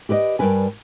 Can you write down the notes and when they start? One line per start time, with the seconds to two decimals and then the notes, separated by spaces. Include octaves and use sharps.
0.09 G4 B4 D5 D#5
0.39 G2 D#3 G3 A#4 B4 G#5